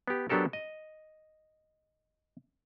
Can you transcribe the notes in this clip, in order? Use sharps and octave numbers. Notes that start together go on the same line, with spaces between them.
B3 G4
F#3 B3 D4 G4 A4 A#4
D#5